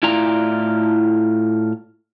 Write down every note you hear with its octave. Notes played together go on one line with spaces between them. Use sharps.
A2 E4 F4 D5 A#5